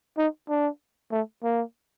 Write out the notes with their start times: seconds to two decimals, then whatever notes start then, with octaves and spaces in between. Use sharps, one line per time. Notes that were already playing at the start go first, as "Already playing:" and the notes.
0.18 D#4
0.49 D4
1.12 A3
1.44 A#3